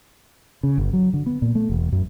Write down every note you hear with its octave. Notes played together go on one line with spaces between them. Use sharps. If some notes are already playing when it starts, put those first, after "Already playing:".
C#3
G1
F#3
D3
B3
A#2
A3
E1
F#2